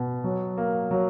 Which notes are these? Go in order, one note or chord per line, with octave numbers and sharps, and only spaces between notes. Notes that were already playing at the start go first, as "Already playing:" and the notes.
Already playing: B2
F#3
A#3
F#3